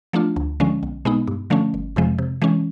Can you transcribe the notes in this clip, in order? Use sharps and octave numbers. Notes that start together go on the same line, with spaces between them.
F3 A3 D4 F4
D2
D3 F3 G#3 C#4
B1
B2 G#3 B3 D#4
G2
D3 F3 A3 C#4
G1
F2 C3 F3 G#3
C3
E3 G#3 C#4